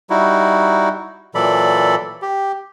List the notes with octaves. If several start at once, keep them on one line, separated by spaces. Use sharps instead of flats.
G3 D#4 E4 F#4
A#2 E3 F#3 A4 D5 B5
G4